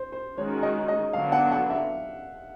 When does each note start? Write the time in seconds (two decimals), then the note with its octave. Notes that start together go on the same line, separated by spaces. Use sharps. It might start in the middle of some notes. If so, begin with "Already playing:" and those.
Already playing: C5
0.12 C5
0.37 D#3 G#3 C#4 F#4 C#5
0.63 D#5
0.88 D#5
1.13 D3 F#3 B3 D4 F#4 F5
1.32 F#5
1.51 F#5
1.70 E5